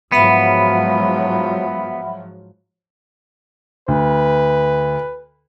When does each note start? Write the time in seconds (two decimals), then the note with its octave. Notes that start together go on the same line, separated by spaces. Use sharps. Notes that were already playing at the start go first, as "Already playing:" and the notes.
0.12 G#2 F3 F#3 B3 E5 F#5 B5
3.88 D2 B4